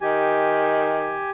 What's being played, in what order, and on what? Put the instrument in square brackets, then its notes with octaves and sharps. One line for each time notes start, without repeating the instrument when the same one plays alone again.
[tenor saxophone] D#3 [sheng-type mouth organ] G4 G#5